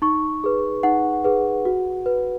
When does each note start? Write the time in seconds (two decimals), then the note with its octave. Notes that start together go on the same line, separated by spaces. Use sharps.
0.02 D#4 C#6
0.44 G#4 B4
0.83 D#4 F#5
1.24 G#4 B4
1.65 F#4
2.06 B4